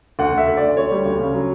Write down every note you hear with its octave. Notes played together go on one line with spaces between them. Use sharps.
D2 F#5
D2 E5
D2
D5
D2
D2 C#5
G3
D2
C#3
F#3